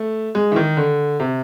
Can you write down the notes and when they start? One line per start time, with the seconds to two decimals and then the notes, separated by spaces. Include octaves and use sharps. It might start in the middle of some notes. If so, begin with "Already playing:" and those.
Already playing: A3
0.35 G#3
0.52 E3
0.56 D#3
0.77 D3
1.20 C3